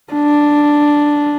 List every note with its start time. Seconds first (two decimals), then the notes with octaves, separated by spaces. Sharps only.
0.13 D4